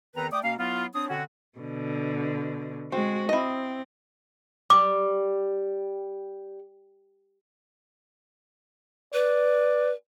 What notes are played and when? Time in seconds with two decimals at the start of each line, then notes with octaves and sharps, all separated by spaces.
0.15 E2 D#3 C4 B4 A#5
0.32 A3 D5 G5 D6 D#6
0.43 B2 A#3 C#4 F5
0.58 F#3 B3 E4 F4
0.93 C4 D4 C#5 D#6
1.09 B2 D3 C4 C#4 F#4
1.58 B2 D3
2.92 G#3 C4 F#4
3.29 C4 E4 D#5
4.70 G3 D6
9.13 B4 D5